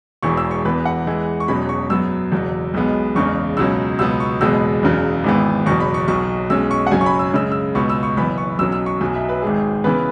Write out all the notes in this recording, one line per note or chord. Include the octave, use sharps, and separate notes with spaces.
E1 E2 E3 C#6
E6
C#6
E2 E3 B3 B4
F#5
E2 E3 G#3
C#6
E1 E2 B2 F#3 C#4 B5
C#6
F#2 F#3 B3 E6
F#1 E2 B2 F#3
B1 B2 G#3 B3
F#1 E2 C#3 G#3 C#6
C#2 B2 F#3 C#4 E6
C#2 B2 F#3 B3 E6
C#6
F#1 E2 B2 G#3 B3 E6
F#1 E2 C#3 F#3
G#1 G#2 E3 B3
F#1 E2 B2 F#3 C#6
B5
C#6
B1 B2 F#3 C#6
B1 B2 G#3 C#4 E6
C#6
F#5
F#1 F#2 F#3 C#4 G#5
C#6
B5
E6
F#2 C#3 G#3 E6
E6
C#2 B2 B3 C#6
E6
C#6
F#1 F#2 E3 B3 B5
C#6
B1 B2 F#3 C#4 E6
E6
C#6
B1 B2 F#3 G#5
E5
B4
G#1 G#2 G#3 G#4
C#3 E3 B3 B4